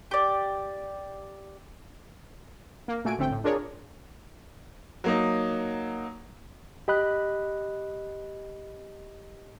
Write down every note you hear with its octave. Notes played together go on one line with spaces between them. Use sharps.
G4 D5
A#3
A#2 A3 F#4 G#5 D7
A1 D3 A3 C4 G5
A2
D4 F4 G#4 A#4 C#5 D5
F#3 A#3 D#4
G4 D#5 B5 F#6